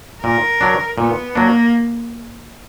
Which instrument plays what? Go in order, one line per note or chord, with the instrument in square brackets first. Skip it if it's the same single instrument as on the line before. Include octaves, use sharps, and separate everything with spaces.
[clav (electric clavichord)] A#2 [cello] A#4
[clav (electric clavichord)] F#3 D4
[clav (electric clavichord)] A#2 [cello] B3
[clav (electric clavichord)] F#3 D4 [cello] A#3